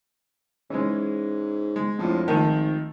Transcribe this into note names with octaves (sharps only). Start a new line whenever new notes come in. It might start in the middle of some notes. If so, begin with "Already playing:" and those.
G#2 E3 G#3 C#4
G#3
F2 A2 F3 D4
G#1 D#3 F3 A3 A5 D#7